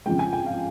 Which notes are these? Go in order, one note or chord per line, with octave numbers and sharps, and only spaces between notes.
F2 C#3 F3 G#3 G5
G#5
G5
F5